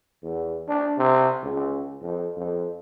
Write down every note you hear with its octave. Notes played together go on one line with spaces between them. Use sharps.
E2
D4
C3
C#2
F2
F2